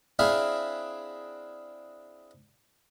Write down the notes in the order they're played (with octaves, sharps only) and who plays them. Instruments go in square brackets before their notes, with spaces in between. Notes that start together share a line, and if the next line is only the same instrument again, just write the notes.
[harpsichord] C4 D4 E4 G#4 E5 F5